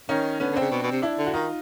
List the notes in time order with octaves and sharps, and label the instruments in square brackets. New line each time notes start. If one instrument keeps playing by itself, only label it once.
[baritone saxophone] D#3 [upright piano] C#4 D#4
[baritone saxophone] D3 [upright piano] B3 C#4
[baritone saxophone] D3
[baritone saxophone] C#3 [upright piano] C4 D4
[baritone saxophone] B2
B2
C3
[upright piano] D4 E4
[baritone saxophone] D3
[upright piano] F#4
[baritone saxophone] D#3 [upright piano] D#4 F4